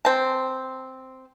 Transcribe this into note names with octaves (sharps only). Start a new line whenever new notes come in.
C4 A5